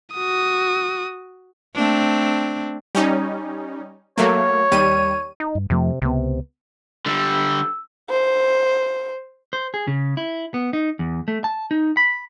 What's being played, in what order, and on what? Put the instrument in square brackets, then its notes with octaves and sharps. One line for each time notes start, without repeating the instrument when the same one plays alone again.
[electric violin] F#4 D#6
[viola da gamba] A3 C4 D4
[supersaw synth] G3 C#4 D#4
[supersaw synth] F#3 A3 A#3 [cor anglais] C#5
[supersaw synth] D#2 G3 D#7
[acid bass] D#4
[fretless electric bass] G2
[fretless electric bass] F2 F3 A3 [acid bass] C3
[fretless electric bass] C#2 B3 [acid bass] C3
[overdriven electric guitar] D3 G3 [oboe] E6
[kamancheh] C5
[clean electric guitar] C5
G#4
C#3
E4
B3
D#4
E2
A3
A5
D#4
B5